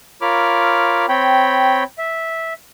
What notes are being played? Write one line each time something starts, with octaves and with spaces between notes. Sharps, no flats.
F4 A#4 C#5 B5 D6 F6
C4 C#5 G5 B5
E5